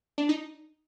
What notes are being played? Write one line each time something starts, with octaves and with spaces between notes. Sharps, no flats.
D4
D#4